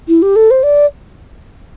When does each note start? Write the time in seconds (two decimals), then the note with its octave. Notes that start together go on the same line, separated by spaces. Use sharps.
0.08 E4
0.22 G4
0.36 A4
0.51 C5
0.63 D5